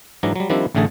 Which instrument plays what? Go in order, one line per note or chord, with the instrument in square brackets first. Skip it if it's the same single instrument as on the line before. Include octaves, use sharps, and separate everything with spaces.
[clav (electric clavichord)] G#2 E3 F#3 D4 A#5
F#3 G3
D#3 F3 G3 C4 D4 E4
A1 A2 D3 A3 G#4 A5